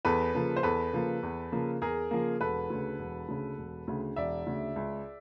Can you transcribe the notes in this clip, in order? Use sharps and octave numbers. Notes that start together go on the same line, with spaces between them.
E2 A4 B4
C#3 F3 A#3
C5
E2 A4 B4
C#3 F3 A#3
E2
C#3 F3 A#3
E2 G#4 A#4
C#3 F3 A#3
E1 A4 B4
D2 C#3
E1
D2 C#3
E1
D2 C#3
E1 D5 E5
D2 C#3
C#2